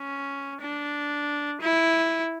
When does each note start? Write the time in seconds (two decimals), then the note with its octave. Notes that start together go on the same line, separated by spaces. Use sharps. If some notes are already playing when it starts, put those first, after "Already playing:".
Already playing: C#4
0.60 D4
1.61 E4